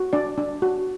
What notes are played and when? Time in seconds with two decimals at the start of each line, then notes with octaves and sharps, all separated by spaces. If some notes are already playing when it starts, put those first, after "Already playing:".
Already playing: F#4
0.13 D4 D5
0.38 D4
0.62 F#4